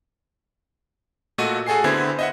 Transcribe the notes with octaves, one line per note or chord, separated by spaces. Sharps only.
A#2 A3 F#4 D#5 D#7
F#4 G#4 A4 G#5 C7
D3 B3 C4 E4 G#6
D#5 E5 F#5